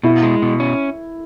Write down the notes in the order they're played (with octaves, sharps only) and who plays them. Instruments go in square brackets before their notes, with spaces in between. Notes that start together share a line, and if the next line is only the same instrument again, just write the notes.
[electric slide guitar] B2 [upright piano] E4
[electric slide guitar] G#3
B2
C#4